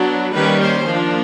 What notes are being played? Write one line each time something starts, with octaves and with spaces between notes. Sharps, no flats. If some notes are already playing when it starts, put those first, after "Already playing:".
Already playing: F#3 B3 D4
D#3 G3 A#3 C#4 B4
C5
F3 A#3 D4